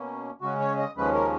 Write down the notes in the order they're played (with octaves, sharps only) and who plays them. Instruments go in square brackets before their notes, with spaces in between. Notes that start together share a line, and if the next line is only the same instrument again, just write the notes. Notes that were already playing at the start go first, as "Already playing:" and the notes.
Already playing: [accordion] B2 A#3 C#4
C#3 G#3 C#4 F#4
C#5
D#5
D#2 C#3 F3 G#3 C#4 B4
A#4